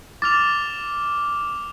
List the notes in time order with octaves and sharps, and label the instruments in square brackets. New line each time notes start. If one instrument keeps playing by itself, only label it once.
[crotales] D6 F6 F7 [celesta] A6